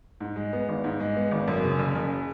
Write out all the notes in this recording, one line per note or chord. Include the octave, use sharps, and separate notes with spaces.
G#2
G#3
B3
G#1
G#2
G#3
B3
G#1
F#2
C#3
F#1
F#1